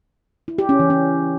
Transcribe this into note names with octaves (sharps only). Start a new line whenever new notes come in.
E4
G4
C#4
E3
C#4